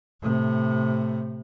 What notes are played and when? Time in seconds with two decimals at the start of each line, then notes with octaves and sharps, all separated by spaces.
0.22 A2 C3